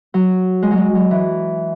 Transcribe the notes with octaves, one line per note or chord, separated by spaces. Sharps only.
F#3
G#3
F#3
G#3
F#3
E3